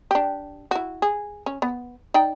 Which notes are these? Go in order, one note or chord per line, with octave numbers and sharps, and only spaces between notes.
D4 G4
E4 F#4
G#4
C#4
B3
D#4 D5 G5